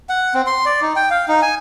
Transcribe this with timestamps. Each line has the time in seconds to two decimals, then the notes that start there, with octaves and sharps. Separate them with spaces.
0.09 F#5
0.34 C4
0.47 C6
0.66 D5
0.81 D#4
0.96 G5
1.10 F5
1.28 D#4
1.42 G#5